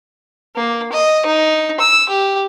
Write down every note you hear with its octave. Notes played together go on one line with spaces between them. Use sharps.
A#3
D#5
D#4
E6
G4